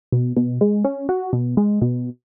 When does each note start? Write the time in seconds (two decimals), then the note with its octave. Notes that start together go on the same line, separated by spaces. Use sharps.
0.12 B2
0.37 B2
0.61 G#3
0.85 C#4
1.09 F#4
1.33 B2
1.57 G#3
1.82 B2